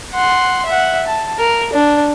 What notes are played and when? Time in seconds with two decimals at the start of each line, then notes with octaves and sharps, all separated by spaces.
0.14 F#5 C6
0.66 E5 F#5
1.07 A5
1.39 A#4
1.73 D4